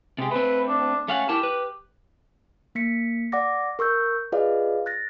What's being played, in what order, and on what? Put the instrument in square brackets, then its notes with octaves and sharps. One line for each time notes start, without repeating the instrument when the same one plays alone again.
[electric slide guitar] C3 G4 [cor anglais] G#3
[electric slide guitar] A3 C4 [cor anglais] B4
[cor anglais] D4
[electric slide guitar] A3 F5 F#5 [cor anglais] C#4
[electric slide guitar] E4 A#4 A5 [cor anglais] G4
[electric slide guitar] B4
[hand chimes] A#3 B6 C#7
D5 F#5 D6 A#6
A#4 C#6 E6 G6
F4 G#4 B4 D5 D#5 F5
F#6 A6 A#6